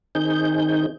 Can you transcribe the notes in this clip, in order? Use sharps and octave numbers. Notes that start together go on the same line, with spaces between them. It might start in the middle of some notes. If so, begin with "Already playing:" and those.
D#3 C4 D#4 G#4 G6